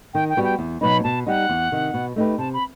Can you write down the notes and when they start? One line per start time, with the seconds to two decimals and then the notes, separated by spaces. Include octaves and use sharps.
0.14 D#3 G5
0.30 G5
0.37 G3 B3 F#4
0.44 G5
0.59 E2
0.81 B2 F#3 B3 D#4 B5
1.04 B2 A5
1.27 G3 D#4 F#5
1.49 E2
1.72 C3 D#3
1.94 B2
2.16 A3 D#4 G4 B4
2.38 C3 A5
2.53 B5